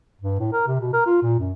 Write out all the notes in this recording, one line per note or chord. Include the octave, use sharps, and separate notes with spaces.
G2
A2
A#4
C3
B2
A#4
F4
A#2
F#2